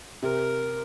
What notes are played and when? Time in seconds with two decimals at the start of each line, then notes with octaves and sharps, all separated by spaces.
0.22 C3 A#4